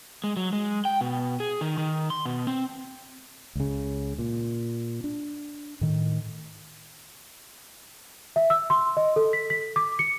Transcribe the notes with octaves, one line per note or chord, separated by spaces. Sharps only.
G#3
F#3
G#3
G5
B2
G#4
D#3
D#3
C6
B2
C4
C#2 C#3
A#2
D4
A2 D#3
E5
E6
C6
D#5
A4
B6
B6
D6
C#7